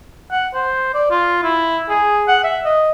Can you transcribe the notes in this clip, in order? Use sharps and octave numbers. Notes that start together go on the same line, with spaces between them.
F#5
C5
D5
F4
E4
G#4
F#5
E5
D#5